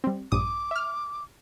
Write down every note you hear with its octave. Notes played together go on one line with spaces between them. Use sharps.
G3 C4
A#1 G2 D6 D#6
E5 F6